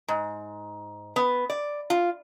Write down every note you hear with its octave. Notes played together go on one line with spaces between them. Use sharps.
G#2
B3
D5
F4